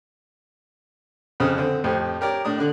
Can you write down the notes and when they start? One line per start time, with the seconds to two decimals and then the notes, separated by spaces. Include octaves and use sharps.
1.40 F2 C#3 C4 D#6
1.58 D3 C4
1.84 F2 A2 G4 C5
2.21 G4 A#4 C#5 D5
2.45 A2 D4 D#6
2.58 D3 D4